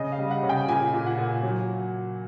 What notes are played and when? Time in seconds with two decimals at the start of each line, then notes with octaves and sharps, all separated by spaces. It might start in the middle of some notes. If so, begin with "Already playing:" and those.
Already playing: C#3 D#5
0.12 F5
0.18 G3
0.31 F#5
0.43 C#3
0.49 G5
0.68 A#2 G#5
0.93 A#2
1.06 F#5
1.18 A#2
1.43 F#3